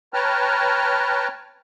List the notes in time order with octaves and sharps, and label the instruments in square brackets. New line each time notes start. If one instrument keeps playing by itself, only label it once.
[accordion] B4 C#5 G5 A5 A#5 F6